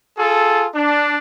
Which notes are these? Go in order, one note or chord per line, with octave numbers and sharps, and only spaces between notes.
F4 G#4 A4
D4